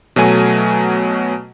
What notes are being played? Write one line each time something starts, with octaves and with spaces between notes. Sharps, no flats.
B2 F#3 A3 G#5 D#7